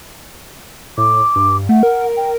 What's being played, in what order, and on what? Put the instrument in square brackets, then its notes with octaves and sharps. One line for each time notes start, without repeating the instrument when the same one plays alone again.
[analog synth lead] A2 [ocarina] D6
[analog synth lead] G2
[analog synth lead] A3 [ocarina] F#5
[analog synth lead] A#4
[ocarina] G5